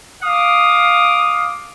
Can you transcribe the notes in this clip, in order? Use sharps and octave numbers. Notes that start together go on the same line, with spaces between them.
F5 D6 D#6